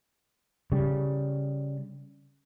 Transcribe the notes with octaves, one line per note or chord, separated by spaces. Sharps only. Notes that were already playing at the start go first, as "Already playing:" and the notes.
C#3 G3